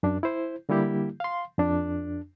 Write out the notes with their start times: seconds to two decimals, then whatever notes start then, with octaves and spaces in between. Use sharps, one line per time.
0.03 F#2 D4
0.23 E4 C5
0.69 D3 G3 A#3 E4 G4
1.20 F5 C6
1.58 F2 D4